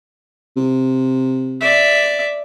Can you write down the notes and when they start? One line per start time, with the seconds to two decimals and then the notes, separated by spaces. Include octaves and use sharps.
0.57 C3
1.61 D5 E5